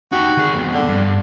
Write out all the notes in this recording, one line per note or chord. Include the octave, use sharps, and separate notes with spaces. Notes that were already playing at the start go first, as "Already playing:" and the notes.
D#4 F#4 G4
D#3 G#4
F2 B2
D3
G2